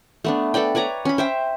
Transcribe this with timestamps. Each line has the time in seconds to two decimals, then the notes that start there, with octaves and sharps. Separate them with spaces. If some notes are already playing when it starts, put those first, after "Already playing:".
0.24 A3 B3 D4
0.54 A4 B4 D5 G5
0.75 B4 C#5 D5 A#5
1.05 C#4 B5
1.18 C5 E5 G5